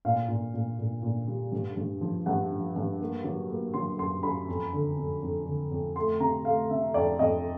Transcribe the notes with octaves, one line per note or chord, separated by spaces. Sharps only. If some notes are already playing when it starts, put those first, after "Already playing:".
A#2 F5
A#2
A#2
A#2
A#2
G3
G2
G2
F3
G2 F#5
F3
G2
A#3
F#3
A#3
F#3 C6
F#2 C6
F#2 B5
F2
D3
F2
F2
D3
F2
A3 C6
C3 A#5
A3 F5
C3 E5
F2 D5
F2 D#5